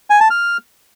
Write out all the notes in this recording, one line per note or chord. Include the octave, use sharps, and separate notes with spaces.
G#5
A5
F6